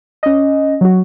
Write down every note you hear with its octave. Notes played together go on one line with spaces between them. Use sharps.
C#4 D#5
F#3 F#4